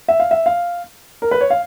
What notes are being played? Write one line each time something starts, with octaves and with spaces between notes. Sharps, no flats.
E5
F5
E5
F5
A#4
B4
C#5
F5